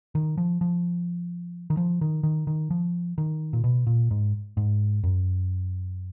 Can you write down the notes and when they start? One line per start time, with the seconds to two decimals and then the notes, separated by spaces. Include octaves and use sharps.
0.15 D#3
0.38 F3
0.61 F3
1.70 D#3
1.77 F3
2.01 D#3
2.23 D#3
2.47 D#3
2.71 F3
3.18 D#3
3.53 A#2
3.64 B2
3.87 A#2
4.11 G#2
4.57 G#2
5.03 F#2